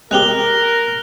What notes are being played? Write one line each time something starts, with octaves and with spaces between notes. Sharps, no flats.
G#3 C4 G4 A#4 F#6 F7 G7